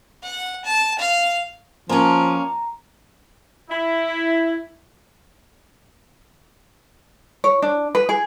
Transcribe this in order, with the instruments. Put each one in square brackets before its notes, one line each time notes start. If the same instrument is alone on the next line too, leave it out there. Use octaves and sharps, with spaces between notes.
[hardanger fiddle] F#5
A5
F5
[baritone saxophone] F3 [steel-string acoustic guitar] A#3 C#4 [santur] A5 A#5 C6
[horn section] E4
[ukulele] C#5
D4
B4
G#4